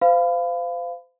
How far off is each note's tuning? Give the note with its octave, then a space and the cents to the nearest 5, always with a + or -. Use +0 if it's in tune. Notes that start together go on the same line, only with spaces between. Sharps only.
C5 -30 F5 -10 B5 +25